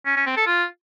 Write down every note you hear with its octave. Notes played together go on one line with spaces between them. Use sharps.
C#4
C#4
C4
A4
F4